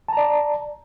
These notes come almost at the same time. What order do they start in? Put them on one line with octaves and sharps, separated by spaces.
A5 A#5 D5